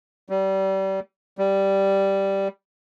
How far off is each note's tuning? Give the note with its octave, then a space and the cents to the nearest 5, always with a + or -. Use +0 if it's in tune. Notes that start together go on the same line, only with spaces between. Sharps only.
G3 -30
G3 -5